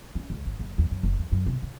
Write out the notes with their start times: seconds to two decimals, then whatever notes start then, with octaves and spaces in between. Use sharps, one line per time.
0.15 C#4
0.30 C#2
0.45 G#1
0.59 F#1
0.78 E2
0.91 F#2
1.03 F#1
1.19 F2
1.32 F#2
1.46 C3
1.62 C#3